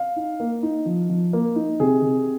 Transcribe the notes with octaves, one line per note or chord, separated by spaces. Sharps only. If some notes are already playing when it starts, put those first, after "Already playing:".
Already playing: F5
D#4
A#3
D#4
F3
F3
A#3
D#4
C3 G#4
C3